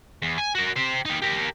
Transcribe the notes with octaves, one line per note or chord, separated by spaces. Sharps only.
E2
G#5
F#4 A#4
G4 C5
D#4 G4
G4 A#4